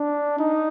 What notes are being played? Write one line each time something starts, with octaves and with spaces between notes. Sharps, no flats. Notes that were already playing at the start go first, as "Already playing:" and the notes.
Already playing: D4
D#4